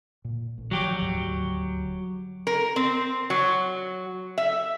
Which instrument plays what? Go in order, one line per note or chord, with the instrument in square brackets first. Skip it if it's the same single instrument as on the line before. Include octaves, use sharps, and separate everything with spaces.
[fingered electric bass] A#2
A1
[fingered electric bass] D#3 F3 [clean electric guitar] F#3 G4
[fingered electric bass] D#1 D2 G#2
[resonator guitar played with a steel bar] A#4
C4
F#3
E5